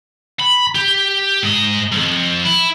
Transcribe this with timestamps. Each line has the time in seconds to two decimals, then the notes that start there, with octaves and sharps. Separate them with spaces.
0.40 B5
0.75 G4
1.43 G#2 D#5
1.92 C2 F2
2.45 E4